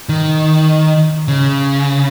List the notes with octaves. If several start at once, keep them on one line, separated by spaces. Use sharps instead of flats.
D#3
C#3